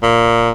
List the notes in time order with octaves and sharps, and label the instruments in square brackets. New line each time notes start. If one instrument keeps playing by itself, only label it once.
[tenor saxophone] A#2